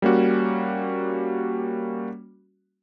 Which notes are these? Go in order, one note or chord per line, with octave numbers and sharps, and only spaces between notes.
G3 A#3 C#4 F#4